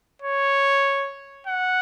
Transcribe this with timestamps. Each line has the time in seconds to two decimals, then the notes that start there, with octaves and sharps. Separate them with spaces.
0.22 C#5
1.47 F#5